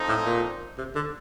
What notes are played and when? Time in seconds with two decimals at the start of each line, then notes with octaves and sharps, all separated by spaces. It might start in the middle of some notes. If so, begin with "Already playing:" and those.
Already playing: F3 C4 D#4 A4
0.09 A2
0.26 A#2
0.78 C3
0.95 D3